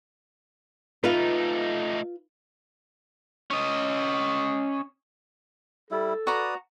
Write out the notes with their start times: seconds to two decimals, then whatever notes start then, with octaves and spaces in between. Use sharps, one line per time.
1.04 A3 D#4 F4 B4
3.51 C#4 D#5
5.91 G3 E4 A4
6.27 F#4 B4 D5 A#5 D#6